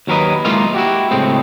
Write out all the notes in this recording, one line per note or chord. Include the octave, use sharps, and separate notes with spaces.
D#2 F#3 A#4 B4 D#5
G#3 A#3 E4 F4 D#5 F5
E4 F#4 G4
C#2 A2 G#3 C4